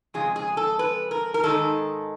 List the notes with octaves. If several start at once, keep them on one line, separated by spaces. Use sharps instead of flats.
F2 C#3 G#3 G#4
G#4
A4
B4
A#4
A#4
G#2 D#3 G#3 A4